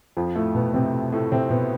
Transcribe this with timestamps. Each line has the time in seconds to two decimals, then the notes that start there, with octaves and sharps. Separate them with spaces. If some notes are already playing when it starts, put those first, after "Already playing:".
0.17 F2 F3
0.35 A2 A3
0.55 B2 B3
0.74 C3 C4
1.12 A2 A3
1.32 C3 C4
1.50 B2 B3